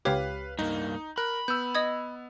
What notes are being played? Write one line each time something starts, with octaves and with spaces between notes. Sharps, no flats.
C#2 G4 B4 C#5 F5
G2 A#3 D#4
A#4 B5 F#6
B3 E6 G6
D#5 D#6 G#6